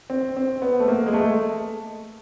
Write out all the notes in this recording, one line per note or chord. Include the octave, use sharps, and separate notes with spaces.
C4
C4
B3
A3
A#3
G#3
A3